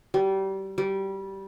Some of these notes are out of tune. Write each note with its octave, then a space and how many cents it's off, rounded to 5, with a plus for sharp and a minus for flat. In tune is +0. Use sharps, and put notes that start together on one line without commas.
G3 -25
G3 -15